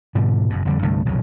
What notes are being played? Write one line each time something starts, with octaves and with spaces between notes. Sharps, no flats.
G#2 B2 D3 G3
F#1 F#2 B2
F2 D3 G3
C2 G2 D3 A3
D#1 B1 F2 C#3